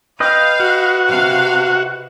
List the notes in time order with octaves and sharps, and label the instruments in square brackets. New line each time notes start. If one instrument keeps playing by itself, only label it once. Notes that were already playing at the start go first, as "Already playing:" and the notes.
[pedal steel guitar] B4 D#5 G5 [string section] F5
[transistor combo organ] F#4
[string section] C3 F5